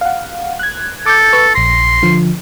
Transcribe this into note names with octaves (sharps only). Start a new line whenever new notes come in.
F5 F#5
F#6 G#6
A4 D6 G6
B4 C#6 E6
A#1 C6 A#6
D3 F3